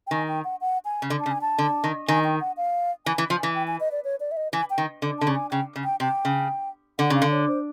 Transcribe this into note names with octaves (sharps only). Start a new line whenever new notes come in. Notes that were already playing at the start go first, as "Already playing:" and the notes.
G5
D#3 G#5
G5
F#5
F#5
G#5
C#3
D3
A5
C#3
G#5
A5
D3
D#3
D#3 G#5
G5
F#5
F5
E3 G#5
E3
F3
E3 G#5
G5
G#5
D#5
D5
C#5
D5
E5
D#5
E3 G#5
G5
D#3
D3
D3 A5
C#3
G#5
C#3 G5
C#3
G5
C3 G5
C#3
D3 F#5
C#3 F5
D3
C#5
C5